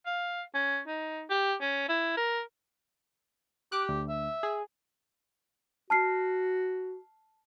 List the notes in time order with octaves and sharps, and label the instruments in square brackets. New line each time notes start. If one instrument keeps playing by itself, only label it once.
[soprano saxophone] F5
C#4
D#4
G4
C#4
E4
A#4
[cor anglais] G4 [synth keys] D6 F#6
[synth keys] D2
[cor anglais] E5
[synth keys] G#4
[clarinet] F#4 [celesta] A5 F6 C7